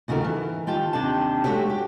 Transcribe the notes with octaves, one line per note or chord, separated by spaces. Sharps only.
D#2 C#3 A3 F#4 A#4
E3
D#3 F4 G4 G5 A5
D#2 C3 D4 G5 A5
G#3 A3 B3 F#4 G4 C#5
G4